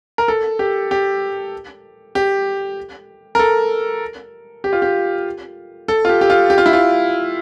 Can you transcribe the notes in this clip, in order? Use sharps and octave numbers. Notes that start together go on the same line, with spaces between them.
A#4
A4
G4
G4
G4
A#4
A4
G4
F4
G4
A4
F4
G4
G4
F4
G4
F4
E4
F4